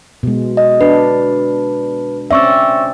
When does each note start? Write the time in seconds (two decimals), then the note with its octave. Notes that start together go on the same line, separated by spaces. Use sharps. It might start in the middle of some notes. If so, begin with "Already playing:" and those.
0.23 B2 G#3
0.57 D#5
0.81 D4 B4
2.31 C4 C#4 D5 E5 C#6 E6